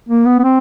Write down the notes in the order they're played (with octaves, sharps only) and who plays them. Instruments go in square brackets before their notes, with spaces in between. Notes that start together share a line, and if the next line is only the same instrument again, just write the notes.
[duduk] A#3
B3
B3
C4